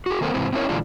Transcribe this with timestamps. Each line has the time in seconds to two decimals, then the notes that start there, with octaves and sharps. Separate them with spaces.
0.06 F#4 G#4
0.21 D#3 A#3 C4 A4 A#4
0.34 G#2 C3 E3 C4
0.53 C4 C#4 E4 G4 A#4 C#5
0.69 A#2 D3 E3 G#3 D4 F4